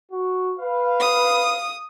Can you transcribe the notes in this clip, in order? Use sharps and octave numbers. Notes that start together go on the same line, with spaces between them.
F#4
B4 F5
D#6